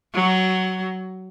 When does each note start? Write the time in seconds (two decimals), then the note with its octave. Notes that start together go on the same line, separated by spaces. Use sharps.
0.14 F#3